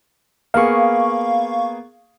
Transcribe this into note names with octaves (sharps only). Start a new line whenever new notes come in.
A#3 B3 G#4 F5 C#6